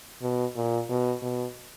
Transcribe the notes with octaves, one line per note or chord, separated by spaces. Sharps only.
B2
A#2
B2
B2